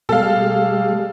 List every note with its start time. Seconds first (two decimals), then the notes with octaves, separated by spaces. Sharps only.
0.09 B2 G3 G#3 A4 F5